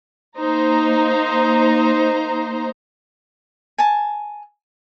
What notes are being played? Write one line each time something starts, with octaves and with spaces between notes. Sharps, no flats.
A#3 D#4 C5 A#5
G#5 A5